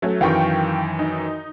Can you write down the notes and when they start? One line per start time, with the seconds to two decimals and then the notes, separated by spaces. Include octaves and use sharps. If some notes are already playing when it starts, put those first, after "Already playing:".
0.02 F#3 A3 C#4
0.21 F#2 D#3 E3 F5 G5 C#6
0.99 D#4